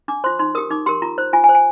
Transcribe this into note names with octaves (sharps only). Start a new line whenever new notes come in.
D4 D6
F4 C5 C6
D#4 C6
G4 A#4 D#6
D#4 D6
G4 A#4 C6
F4 A#5
C5
F4 G#5
G#5
C5
G#5